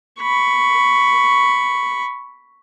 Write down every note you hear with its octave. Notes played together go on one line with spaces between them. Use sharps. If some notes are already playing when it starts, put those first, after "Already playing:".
B5 C#6